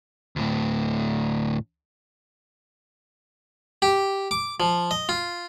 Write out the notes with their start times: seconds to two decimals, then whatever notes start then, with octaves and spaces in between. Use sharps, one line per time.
0.36 D2 A2
3.82 G4
4.31 D6
4.60 F3
4.91 D#5
5.09 F4